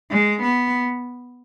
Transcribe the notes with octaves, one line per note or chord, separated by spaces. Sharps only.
G#3
B3